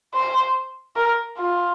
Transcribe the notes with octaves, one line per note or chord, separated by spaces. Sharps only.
C5
A#4
F4